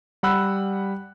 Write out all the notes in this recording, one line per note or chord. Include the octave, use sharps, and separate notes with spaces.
G3 F#5 B5 E6 F#6